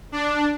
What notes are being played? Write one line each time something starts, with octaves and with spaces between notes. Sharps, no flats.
D4